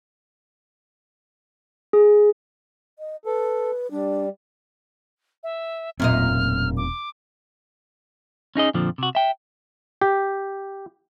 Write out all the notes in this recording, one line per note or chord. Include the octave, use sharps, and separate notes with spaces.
G#4
D#5
A4 B4
G3 D4
E5
E1 F#2 A#2 C4 D#5 F6
D6
C#4 D#4 G#4 D#5
F2 A#2 D3 F3
C3 F#4
E5 G5
G4